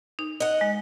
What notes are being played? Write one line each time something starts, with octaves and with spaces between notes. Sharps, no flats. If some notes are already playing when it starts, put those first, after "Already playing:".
D#4
D#5 F#5
G#3